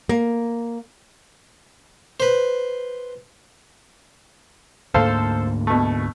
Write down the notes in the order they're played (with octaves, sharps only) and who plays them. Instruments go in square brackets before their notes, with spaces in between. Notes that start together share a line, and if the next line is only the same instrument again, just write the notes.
[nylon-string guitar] A#3
[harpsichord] B4 C5
[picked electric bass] D2 G#2 A#3 [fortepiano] A4 C5 F5
[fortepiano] B2 A3